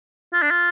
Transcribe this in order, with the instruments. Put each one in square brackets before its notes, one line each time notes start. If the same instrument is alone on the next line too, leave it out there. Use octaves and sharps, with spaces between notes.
[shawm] F4
D4
F4